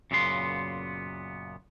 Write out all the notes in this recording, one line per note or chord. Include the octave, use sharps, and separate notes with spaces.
F#2 A#2 C#3 B3 C6